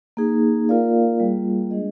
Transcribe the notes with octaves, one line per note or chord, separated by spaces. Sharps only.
A#3 D#4 G#4
A#3 F4 A#4 D5 F5
G3 A#3 F4 G#4
G#3 D4 G#4 D#5